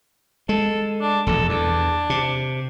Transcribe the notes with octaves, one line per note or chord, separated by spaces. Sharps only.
G#3 A4
D4
E1 A#1 A4
E2 D4
C3